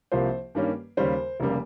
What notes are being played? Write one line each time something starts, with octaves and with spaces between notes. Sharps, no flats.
C2 C3 F3 A#3 C5
G2 D#3 G3 A#3 C#4
D#2 C#3 G3 C#4 C5
F1 C#3 G3 A#3